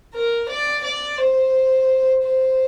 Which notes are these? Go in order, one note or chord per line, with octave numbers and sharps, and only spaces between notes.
A#4
D5
D5
C5
C5